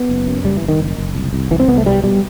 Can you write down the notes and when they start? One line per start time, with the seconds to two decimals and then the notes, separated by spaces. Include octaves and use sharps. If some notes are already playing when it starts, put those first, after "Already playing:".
Already playing: B3
0.09 F#1
0.27 F#2
0.45 F#1 G3
0.57 E3
0.62 F#1
0.68 D#3
0.80 F#1
0.98 F#1
1.15 C2
1.33 C2
1.51 C2 E3
1.60 C4
1.68 C2 B3
1.77 A3
1.86 B2 G3
2.04 B2 G3